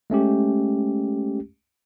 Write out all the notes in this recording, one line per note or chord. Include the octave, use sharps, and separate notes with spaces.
G#3 A3 C#4 G4